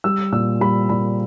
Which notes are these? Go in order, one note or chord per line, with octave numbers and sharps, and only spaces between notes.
G3 E6
A#2 E6
G3 B5
A#2 B5